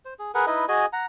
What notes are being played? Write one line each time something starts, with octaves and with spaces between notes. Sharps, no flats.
C5
G#4
G#4 A#4 B4 F#5
D#4 E4 B4 D#5
F#4 G#4 D#5 G#5
F#5 A#5